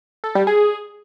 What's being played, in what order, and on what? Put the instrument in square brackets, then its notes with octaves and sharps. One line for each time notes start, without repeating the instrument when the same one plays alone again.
[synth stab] A4
G3
G#4